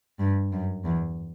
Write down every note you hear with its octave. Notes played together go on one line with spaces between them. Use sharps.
G2
F#2
E2